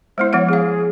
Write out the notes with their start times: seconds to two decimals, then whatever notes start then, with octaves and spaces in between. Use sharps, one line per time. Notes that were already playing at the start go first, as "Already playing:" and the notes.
0.18 G#3 B3 E4 C5
0.33 F3 B3 C#5 F#5
0.49 B3 G#4 F5